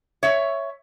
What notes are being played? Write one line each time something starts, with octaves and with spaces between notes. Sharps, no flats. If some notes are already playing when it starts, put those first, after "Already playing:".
C#5 E5